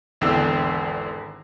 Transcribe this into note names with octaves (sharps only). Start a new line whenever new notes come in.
G#1 E2 D3 G5 E6